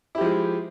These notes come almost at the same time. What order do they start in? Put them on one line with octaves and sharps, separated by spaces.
E4 G4 F3 G#3